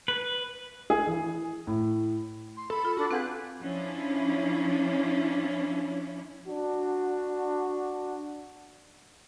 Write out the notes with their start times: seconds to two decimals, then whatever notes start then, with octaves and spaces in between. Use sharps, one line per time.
0.08 B4
0.90 G#4
1.07 E3
1.67 A2
2.56 C6
2.70 A4 B5
2.85 F4
2.97 D4 F#4 A4 A5 B5
3.11 C4 G#4 B4 F5 F#5 F#6 G6
3.59 F3 C#4 D4 E4
6.48 D4 F#4